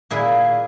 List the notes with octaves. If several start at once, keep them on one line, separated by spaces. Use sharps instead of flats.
A#2 E4 G#4